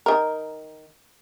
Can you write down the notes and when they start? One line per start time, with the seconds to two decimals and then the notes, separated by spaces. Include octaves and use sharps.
0.06 D#3 A#4